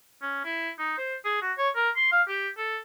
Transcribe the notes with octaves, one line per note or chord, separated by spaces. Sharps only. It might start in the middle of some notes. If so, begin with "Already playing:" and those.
C#4
E4
D#4
C5
G#4
F#4
C#5
A#4
C6
F5
G4
A4